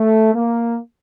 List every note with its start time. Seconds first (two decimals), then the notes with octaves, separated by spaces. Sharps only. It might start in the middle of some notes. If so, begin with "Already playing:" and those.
Already playing: A3
0.34 A#3